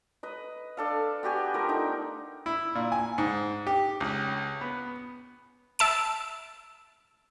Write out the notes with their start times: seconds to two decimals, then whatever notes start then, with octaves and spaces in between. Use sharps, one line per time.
0.23 B4 D#5
0.77 D4 A4 F5
1.23 B3 F#4 G4 G#5
1.54 F3 A3 A#4
1.69 D4 D#4
2.46 E4
2.75 A#2
2.92 G#5
3.18 G#2
3.67 G4
4.00 C#2
4.61 B3
5.79 E5 A5 D7